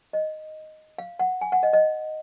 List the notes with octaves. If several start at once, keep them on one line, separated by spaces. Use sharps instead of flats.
D#5
F5
F#5
G#5
F#5
D#5
D#5